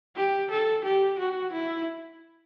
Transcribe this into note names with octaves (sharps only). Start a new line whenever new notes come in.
G4
A4
G4
F#4
E4